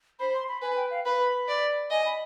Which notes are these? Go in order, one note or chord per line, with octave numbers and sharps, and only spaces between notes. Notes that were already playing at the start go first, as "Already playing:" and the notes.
C5 B5
C6
B5
B4 G#5
G5
F5
B4 B5
D5
D#5 G#5
B5